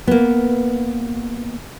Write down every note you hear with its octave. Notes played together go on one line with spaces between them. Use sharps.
A#3 B3